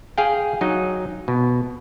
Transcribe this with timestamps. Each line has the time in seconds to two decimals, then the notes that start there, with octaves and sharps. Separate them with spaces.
0.18 G#4 F5 G5
0.61 F#3 D#4 D#5
1.28 B2